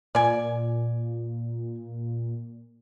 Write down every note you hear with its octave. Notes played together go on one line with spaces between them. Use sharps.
A#2 D5 G#5